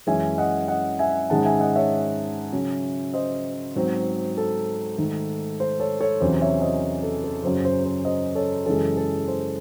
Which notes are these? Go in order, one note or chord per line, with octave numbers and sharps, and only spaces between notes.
F#2 E3 G#3 C#4 E5 G#5
D#5 F#5
D#5 F#5
E5 G#5
G#2 D#3 G#3 C#4 F#5 A5
E5 G#5
D#5 F#5
C#5 E5
C#3 F#3 C#4
C5 D#5
G#2 F#3 C4
A4
G#2 D#3 A3
C5
A4 C#5
A4 C#5
E2 C3 F#3 C#4 C5
C#5 E5
C5 D#5
A4
A4
F#2 C#3 F#3 C5
C5
C5
C5 D#5
A4 C#5
F#2 C#3 E3 G#3 A4
A4
C5